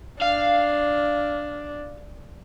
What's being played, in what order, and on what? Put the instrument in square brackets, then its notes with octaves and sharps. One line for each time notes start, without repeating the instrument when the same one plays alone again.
[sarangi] D4 [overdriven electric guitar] F5